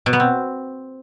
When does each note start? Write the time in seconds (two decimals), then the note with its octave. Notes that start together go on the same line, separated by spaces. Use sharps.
0.06 B2
0.13 B3
0.20 C4